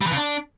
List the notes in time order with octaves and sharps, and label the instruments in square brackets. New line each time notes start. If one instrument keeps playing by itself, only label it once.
[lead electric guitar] G3
E3
C#3
D4